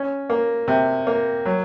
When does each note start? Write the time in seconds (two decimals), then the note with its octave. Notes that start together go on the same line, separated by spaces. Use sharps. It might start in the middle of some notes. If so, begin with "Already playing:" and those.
Already playing: C#4
0.30 A#3
0.68 C3
1.07 A#3
1.45 F#3